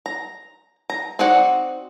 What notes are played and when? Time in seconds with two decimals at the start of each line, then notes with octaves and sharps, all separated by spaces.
0.06 A#5
0.90 A#5
1.19 C4 D#4 F#4 D5 F#5